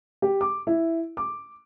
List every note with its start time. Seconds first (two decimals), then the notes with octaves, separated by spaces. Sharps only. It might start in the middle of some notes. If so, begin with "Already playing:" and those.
0.22 G4
0.41 D6
0.67 E4
1.17 D6